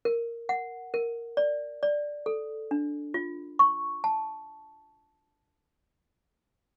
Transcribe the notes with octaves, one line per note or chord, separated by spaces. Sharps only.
A#4
F#5
A#4
D5
D5
A4
D4
F4
C#6
A5